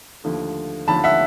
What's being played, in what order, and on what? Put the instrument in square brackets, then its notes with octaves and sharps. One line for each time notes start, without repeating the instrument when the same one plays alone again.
[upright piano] D#2 D3 F3 A3
D#2 D3 F3 A3 A5 B5
E5 F#5